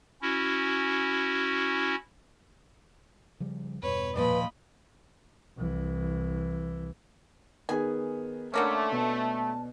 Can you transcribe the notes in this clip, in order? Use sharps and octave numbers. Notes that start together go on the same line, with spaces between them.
C#4 E4 F#4
C#3 F3 G3
E2 G2 B2 B4 C#5
D#2 A#2 F3 B4 D#5 B5
C2 E3
D#3 B3 G#4 G#5
D3 A3 A#3 C#4 D6
B2 A5